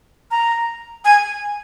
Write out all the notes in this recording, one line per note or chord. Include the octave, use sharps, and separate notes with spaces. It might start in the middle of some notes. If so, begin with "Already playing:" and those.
A#5
G#5